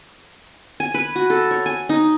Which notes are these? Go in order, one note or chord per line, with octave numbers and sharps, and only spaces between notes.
G#5
B4
F#4
A4
C#5
G#5
D#4